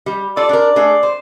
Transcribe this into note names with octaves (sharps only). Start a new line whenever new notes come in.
G3
F4 A4 D5
D4 A#4 D5
A3 D4 G#4
C5